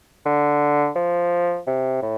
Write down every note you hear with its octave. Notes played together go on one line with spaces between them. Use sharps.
D3
F3
C3
A2